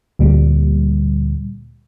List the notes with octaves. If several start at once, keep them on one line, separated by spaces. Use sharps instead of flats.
D2 A#2 G3